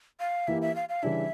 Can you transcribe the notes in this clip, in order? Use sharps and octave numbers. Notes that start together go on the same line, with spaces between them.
F5
E3 A#3 E4 G4 E5
E5
F5
F5
C#3 E3 G3 D4 E5